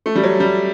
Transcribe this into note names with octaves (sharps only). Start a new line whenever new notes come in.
A3
G3
F#3
G3